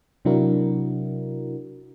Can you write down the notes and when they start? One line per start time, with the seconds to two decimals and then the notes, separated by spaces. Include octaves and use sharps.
0.25 C3 F#3 D4 E4 F#4 A#4